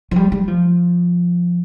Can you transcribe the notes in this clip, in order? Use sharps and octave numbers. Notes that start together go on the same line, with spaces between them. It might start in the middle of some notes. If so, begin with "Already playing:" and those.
F3
G3
G3
F3